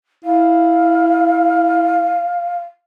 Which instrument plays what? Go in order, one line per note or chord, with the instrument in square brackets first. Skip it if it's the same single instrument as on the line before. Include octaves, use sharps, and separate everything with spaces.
[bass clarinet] E4 [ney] F5